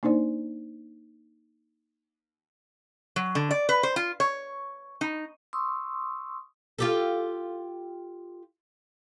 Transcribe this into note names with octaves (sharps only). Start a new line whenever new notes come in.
A#3 D4 D#4 C5 D5
F#3
D3
D5
B4
C5
F4
C#5
D#4
C6 C#6 D#6 E6
F4 G4 A4